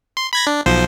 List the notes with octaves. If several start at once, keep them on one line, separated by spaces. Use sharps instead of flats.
C6
B5 G#6 A#6
D4
B1 F3 C5